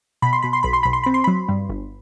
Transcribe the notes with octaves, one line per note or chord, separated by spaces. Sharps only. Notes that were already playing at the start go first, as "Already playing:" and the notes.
B2 B5
C6
B2 B5
C6
B1 B5
C6
B1 B5
C6
C4 B5
C6
F#3 B5
G2
G1